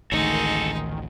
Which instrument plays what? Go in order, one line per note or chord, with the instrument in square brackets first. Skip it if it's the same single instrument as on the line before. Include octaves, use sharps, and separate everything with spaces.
[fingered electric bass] A1 D2 [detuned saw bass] D#3 [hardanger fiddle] G#3 D#4 [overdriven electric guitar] F#4 A4